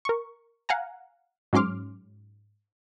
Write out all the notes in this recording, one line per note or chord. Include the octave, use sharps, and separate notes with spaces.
A#4 C#6
F5 F#5 G#5 A#5
G#2 F#3 C#4 C6 D6 F6